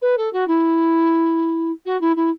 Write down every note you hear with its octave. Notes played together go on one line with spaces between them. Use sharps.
B4
A4
F#4
E4
F#4
E4
E4